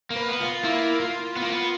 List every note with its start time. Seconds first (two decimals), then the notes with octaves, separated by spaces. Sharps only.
0.10 A#3
0.16 B4
0.29 B3
0.40 F4
0.64 A#3 E4
1.00 F4
1.36 B3
1.42 A#3
1.50 B3